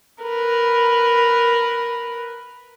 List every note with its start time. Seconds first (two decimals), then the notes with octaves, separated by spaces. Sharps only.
0.23 A#4 B4